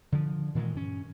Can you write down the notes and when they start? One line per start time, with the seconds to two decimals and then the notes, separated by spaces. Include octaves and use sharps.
0.12 D3 F3
0.55 A#2 D#3 E3 G#3
0.75 G2 C#4